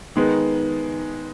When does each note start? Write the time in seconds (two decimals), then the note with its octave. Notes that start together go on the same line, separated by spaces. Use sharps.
0.16 D#3 G#3 B3 D#4